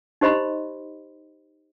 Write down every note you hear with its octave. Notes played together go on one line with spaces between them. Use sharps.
D#4 G4 C5 D#5 B5 C6